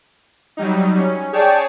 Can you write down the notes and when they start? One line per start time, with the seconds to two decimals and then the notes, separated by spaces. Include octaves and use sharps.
0.57 F#3 G3 D#4
0.98 C#4
1.33 G#4 C#5 D5 G5 A5